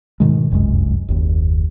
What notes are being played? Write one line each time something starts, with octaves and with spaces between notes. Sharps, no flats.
G#2 B2 D#3 G#3
F1 C2 F#2 G#3
F#1 D#2